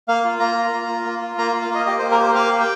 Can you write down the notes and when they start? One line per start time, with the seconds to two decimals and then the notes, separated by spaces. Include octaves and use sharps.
0.08 A#3 F5
0.25 F4
0.40 A#3 A#5
0.57 F4
0.73 A#3
0.88 F4
1.05 A#3
1.21 F4
1.38 A#3 A#5
1.53 F4
1.61 F5
1.70 A#3 D#5
1.86 G4 D#5
1.99 A#3 C5
2.11 A#4
2.20 G4 C5
2.35 A#3 F5
2.52 G4
2.60 G5